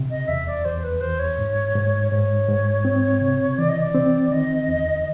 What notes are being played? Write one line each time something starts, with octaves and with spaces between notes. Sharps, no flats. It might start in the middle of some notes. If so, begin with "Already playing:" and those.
Already playing: C3
D#5
E2 E5
D5
E2 C5
B4
E2 C5
C#5
G#2
G#2
G#2 C#5
G#2
C4
C3
E3 D5
D#5
D5
C4
D#3 D#5
E2